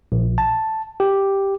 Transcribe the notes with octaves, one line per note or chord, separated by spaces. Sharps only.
A#1
A5
G4